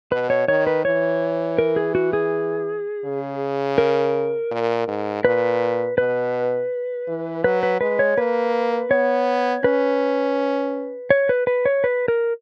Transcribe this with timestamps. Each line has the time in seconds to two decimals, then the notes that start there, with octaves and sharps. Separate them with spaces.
0.11 B2 B4
0.30 C#5
0.48 D#3 C#5
0.67 B4
0.85 E3 C#5
1.59 A#4
1.76 G#4
1.95 F#4
2.13 G#4
3.05 C#3
3.78 A#4
4.51 A#2
4.88 G#2
5.24 A#2 B4
5.98 B2 B4
7.08 E3
7.44 F#3 B4
7.63 B4
7.81 G#3 B4
7.99 C#5
8.18 A#3 B4
8.91 B3 C#5
9.64 C#4 B4
11.10 C#5
11.29 B4
11.47 B4
11.66 C#5
11.84 B4
12.08 A#4